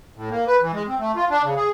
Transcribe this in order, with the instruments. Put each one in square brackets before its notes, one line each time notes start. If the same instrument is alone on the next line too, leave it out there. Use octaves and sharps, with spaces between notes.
[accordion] A2
A#3
B4
E3
G#3
C4
A3
F4
D4
C#3
G#4